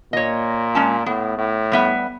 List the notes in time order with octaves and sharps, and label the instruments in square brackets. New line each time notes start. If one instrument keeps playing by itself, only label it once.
[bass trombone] A#2 [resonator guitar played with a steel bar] C#5 D#5
[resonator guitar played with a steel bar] G#3 C#4 A5
[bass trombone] A2 [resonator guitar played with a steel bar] B3
[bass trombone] A2
[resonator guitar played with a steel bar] G3 B3 E5